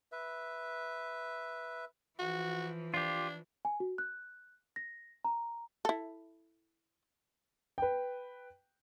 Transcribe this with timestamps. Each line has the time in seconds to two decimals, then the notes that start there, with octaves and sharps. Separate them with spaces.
0.12 B4 E5
2.19 E3 F3 F#4
2.94 D4 F4 G4
3.65 G#5
3.80 F#4
3.98 F#6
4.76 A#6
5.25 A#5
5.85 E4 A4
7.78 B4 G5